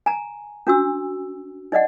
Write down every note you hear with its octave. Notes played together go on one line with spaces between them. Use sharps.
G#5 A#5
C#4 D4 F#4 E6
D#4 D5 D#5 F#5